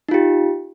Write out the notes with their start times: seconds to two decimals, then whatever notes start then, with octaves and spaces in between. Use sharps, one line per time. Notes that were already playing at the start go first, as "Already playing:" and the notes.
0.09 D#4
0.11 F4
0.14 G4